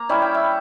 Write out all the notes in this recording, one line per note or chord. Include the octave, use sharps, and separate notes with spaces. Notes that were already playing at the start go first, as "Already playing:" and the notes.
Already playing: A#3 A#5
G3 C#4 E4 E5
G5
E5